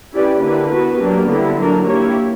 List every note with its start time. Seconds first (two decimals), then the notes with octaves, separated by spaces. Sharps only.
0.14 C#4 E4 G4 B4 D5
0.43 D3 A#3 E4 G4 B4
0.72 B3 F#4 B4
1.02 F#3 A#3 D4 G4
1.31 D3 G3 B3 E4
1.60 F#3 A#3 D4 A#4
1.89 A#3 E4 G4 C#5